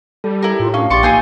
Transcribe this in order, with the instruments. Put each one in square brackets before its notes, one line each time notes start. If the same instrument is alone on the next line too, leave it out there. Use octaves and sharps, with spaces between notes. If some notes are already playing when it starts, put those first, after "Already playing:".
[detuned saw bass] G3 [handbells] A4
[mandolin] E4 A#4 [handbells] G4
[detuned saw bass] A2 [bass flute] F4
[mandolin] C#4 [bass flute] D4 [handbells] F5
[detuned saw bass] A#1 [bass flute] G4 [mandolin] D5 C6 C#6 [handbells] A6 C#7
[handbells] A#3 G#5 G6 [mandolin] D#4 F4 G#4